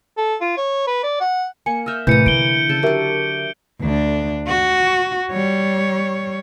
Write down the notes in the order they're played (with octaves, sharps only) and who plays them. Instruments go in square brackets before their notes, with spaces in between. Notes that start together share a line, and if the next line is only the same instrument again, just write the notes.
[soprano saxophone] A4
F4
C#5
B4
D5
F#5
[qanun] A#3 [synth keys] G#5 C#7
[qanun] D#5 E5 [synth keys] E6 F6 G6
[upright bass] A2 [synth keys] C3 [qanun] E3 A#5 [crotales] G6 C#7 D#7
[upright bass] D3 [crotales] D7 G7
[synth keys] C#3 C#7 E7 [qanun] A4
[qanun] F#3 D4 [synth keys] G4 A#4 E5
[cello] D2 D4
F#4
G3 C#5